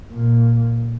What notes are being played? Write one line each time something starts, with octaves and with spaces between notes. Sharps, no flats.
A#2